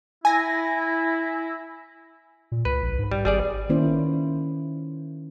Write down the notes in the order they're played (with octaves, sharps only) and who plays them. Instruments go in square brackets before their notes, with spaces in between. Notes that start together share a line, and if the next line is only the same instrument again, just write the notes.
[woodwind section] E4 [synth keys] G#5 A#6
[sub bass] A#2
[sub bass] C#2 [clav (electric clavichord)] B4
[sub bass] A#1
G#2
[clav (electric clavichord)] G3
[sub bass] G#1 [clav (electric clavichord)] G3 G#4 D5
[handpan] D#3 A#3 C#4 E4 C5